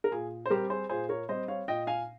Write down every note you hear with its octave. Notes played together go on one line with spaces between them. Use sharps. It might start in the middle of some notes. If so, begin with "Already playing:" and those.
A#4
A#2 G#4
C5
G3 C4 G4 A#4
G#4 C5
A#2 G#4 C5
A#4 C#5
G3 C4 C5 D#5
C#5 F5
A#2 D#5 G5
F5 G#5